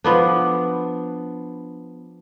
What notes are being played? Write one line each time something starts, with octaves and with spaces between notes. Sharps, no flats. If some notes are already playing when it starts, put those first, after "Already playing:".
F3 B3 D4